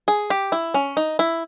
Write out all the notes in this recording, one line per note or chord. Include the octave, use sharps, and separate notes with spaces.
G#4
G4
E4
C#4
D#4
E4